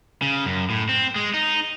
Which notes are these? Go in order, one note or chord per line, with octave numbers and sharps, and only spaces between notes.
C#3
F#2
A2
C4
G#3
D#4